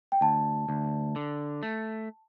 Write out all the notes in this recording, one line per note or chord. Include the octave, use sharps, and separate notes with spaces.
G5
D2 A5
D2
D3
A3